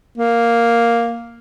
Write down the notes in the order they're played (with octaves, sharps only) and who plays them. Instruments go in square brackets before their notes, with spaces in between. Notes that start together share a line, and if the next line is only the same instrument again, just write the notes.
[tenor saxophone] A#3